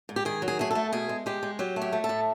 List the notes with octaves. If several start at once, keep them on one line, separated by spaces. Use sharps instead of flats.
G#2
G4
D#3 G#4
F#3
G#4
A3 G#4
A3 A4
B2 G#4
G#3
G#3 G4
G#3
F#3 G4
A3
G4
A3
A4
A2